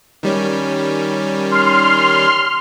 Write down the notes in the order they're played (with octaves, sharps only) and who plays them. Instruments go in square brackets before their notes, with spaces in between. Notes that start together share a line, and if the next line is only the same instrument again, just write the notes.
[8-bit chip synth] D#3 G3 C#4
[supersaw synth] C6 F6